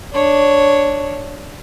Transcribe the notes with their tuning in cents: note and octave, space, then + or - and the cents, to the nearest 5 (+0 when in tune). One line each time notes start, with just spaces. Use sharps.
D4 +0 C#5 +0